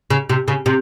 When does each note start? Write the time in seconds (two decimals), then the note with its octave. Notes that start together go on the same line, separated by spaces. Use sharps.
0.10 C#3
0.29 C3
0.48 C#3
0.66 C3